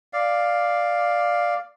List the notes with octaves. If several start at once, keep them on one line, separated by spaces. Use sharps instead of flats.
D5 F5